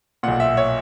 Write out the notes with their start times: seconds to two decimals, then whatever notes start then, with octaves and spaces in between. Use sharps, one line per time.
0.23 B1 A#2 F#5
0.40 E5
0.57 C#5